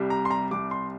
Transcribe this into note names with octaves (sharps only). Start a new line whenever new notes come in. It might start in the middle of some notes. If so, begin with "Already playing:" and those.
Already playing: C2 C3 G3
A#5
C6
A#5
C2 C3 G3 D6
C6